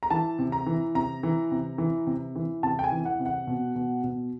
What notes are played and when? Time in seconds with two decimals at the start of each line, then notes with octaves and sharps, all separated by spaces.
0.03 A#5
0.10 E3 A5
0.39 C3
0.52 A#5
0.66 E3
0.95 C3 A#5
1.23 E3
1.51 C3
1.78 E3
2.07 C3
2.36 E3
2.63 C3 A5
2.79 G5
2.84 G#5
2.92 E3
3.05 F#5
3.20 C3
3.26 F#5
3.47 B2
3.75 B2
4.04 B2